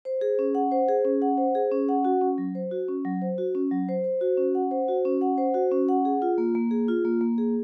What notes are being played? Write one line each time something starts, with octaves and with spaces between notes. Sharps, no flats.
C5
G#4
C#4
F#5
C5
G#4
C#4
F#5
C5
G#4
C#4
F#5
F#4
C#4
F#3
C5
F#4
C#4
F#3
C5
F#4
C#4
F#3
C5
C5
F#4
C#4
F#5
C5
F#4
C#4
F#5
C5
F#4
C#4
F#5
G#4
F4
A#3
A#3
G#4
F4
A#3
A#3
G#4